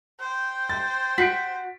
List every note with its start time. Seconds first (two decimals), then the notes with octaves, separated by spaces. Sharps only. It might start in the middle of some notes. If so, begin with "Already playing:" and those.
0.20 C5 G5
0.69 A6
1.18 F#4 B6 C7 D7